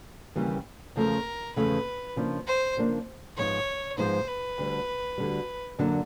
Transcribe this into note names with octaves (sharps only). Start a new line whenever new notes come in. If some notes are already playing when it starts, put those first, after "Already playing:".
D#2 C#3 E3 G3 A#3
E2 C#3 F3 A3 A#4
E2 C#3 F3 A3 B4
C#3 F3 A#3 D4
C5
C#3 F3 A#3 D4
G#2 F3 G#3 B3 D#4 C#5
G#2 F3 G#3 B3 D#4 C5
B4
D2 D3 G3
D2 D3 G3
F#2 D3 F#3 A#3 D4